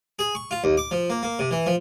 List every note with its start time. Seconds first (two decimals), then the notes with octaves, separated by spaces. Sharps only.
0.19 G#4
0.35 C#6
0.51 F4
0.64 D#2
0.77 D6
0.91 F3
1.10 A#3
1.23 A#3
1.39 C3
1.51 E3
1.66 F3